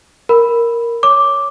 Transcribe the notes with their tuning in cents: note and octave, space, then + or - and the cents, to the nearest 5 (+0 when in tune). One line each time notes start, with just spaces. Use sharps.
A#4 +0 B5 +0
C#5 +5 D6 +0